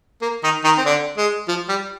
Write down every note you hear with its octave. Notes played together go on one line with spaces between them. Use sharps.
A#3
D#3 D#4
D#3 D#4
C4
D3 D4
G#3
F3
G3